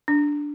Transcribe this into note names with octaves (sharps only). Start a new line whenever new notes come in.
D4